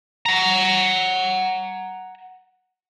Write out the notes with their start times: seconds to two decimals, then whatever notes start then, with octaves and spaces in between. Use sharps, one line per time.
0.26 F#5 A#5